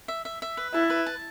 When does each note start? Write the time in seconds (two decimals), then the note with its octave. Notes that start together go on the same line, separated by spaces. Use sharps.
0.08 E5
0.25 E5
0.42 E5
0.57 B4
0.74 E4 A5
0.90 B4
1.06 A5